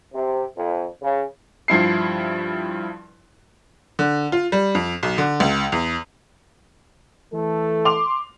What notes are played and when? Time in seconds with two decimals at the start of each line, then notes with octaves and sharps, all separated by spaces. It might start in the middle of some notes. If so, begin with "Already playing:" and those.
0.12 C3
0.56 F2
1.00 C#3
1.68 G2 F3 E4 C7
3.99 D3
4.32 F4
4.52 G3
4.75 F2
5.03 B1
5.18 D3
5.40 C#2
5.72 E2
7.32 E3 A3 A4
7.85 C6 D6 F7